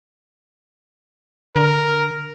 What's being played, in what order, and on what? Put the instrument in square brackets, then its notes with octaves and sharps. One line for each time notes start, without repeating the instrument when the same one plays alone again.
[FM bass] D3 [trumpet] A#4